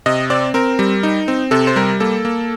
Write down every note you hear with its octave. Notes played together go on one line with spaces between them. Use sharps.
C3 D#5
C4 D5
C4 A#4
G3
D#4
C4
C3 A4
C5
G3 A#4
A#3 A4
A#3